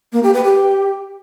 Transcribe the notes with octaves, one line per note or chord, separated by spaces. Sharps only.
A#3
G4
B4
G4